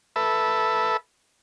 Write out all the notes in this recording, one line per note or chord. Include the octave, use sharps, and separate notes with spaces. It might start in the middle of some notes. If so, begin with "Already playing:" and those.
A4 B4 E5